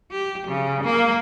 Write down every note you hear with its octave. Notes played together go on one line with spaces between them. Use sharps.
G4
C#3
A#3